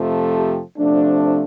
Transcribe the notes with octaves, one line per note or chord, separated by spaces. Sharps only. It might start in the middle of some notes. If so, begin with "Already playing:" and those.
Already playing: F2 C3 F3 A3
G4
C3 F3 A3 D4